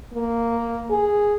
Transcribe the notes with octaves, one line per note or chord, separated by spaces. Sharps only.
A#3
G#4